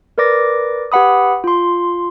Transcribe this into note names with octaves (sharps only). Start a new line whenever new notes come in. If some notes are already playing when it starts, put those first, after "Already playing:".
A#4 B4 D5 D6 A#6
G4 B4 F#5 B5 D#6
F4 C6